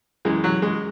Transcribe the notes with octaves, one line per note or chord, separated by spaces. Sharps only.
F#2 E3 G#3
F#3
G#3